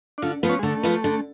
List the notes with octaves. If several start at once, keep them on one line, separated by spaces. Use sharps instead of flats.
D4
D3 F4
F3 B3 F4 B4
C#4
G#3
D3 A3
F3 B3 F4 B4
D3